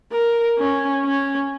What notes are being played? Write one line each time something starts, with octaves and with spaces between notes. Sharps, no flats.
A#4
C#4
C#4